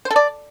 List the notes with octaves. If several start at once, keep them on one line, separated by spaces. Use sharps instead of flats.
C5
A4
D5